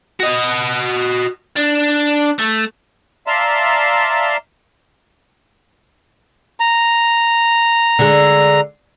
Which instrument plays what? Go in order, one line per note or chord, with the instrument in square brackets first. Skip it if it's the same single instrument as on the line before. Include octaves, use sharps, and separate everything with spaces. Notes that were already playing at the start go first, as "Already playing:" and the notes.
[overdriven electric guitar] F#4 D#5
D4
A3
[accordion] D5 E5 F5 A5 A#5 C6
[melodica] A#5
[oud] D3 G#3